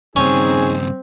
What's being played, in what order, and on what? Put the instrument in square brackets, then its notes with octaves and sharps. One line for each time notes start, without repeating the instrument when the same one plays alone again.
[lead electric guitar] G2 C#3 [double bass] C4 [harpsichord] C#4 [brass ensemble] D#4 G#4